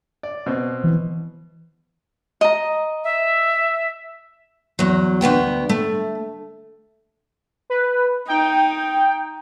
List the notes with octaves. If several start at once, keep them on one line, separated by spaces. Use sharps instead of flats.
D5
B2 C4
E3
D#5 A#5
E5
E2 F#3
D2 C#3 B3 G5
A3
B4
D#4 G5